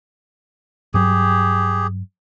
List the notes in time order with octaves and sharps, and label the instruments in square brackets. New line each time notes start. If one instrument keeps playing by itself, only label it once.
[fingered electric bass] G2 F#3 [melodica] G4 G#4